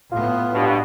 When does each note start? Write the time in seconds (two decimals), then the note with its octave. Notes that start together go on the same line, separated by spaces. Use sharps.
0.12 A2 B3 F4
0.52 G2 B2